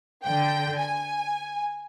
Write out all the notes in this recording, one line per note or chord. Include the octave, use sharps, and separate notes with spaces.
D3 G5
G#5